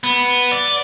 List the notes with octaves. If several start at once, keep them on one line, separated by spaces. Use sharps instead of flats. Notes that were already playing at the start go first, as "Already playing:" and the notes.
B3
D5